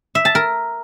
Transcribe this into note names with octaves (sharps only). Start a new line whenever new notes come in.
E5
A5
A#4